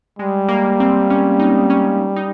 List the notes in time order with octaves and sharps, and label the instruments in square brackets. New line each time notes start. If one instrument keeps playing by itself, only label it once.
[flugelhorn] G3 [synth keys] G#3
[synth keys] A#3
C4
C#4
D#4
C#4
D#4